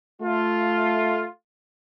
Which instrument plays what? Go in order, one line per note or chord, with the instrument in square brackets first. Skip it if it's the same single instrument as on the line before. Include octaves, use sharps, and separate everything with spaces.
[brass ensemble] A3 F4